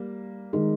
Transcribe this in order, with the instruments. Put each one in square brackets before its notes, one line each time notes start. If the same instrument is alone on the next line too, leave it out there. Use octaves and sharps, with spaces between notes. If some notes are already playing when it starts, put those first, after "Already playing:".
Already playing: [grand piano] G3 A#3
[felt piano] D#3 G#3